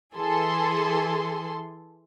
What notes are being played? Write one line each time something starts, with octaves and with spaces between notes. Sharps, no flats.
E3 G#4 A4 C6